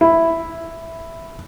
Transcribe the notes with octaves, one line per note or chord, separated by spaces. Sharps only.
E4